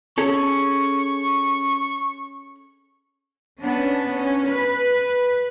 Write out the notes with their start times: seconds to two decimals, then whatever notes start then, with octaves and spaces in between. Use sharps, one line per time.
0.18 C#4 G#4 A4 C#6
3.61 B3 C#4 D4
4.13 C#4
4.49 B4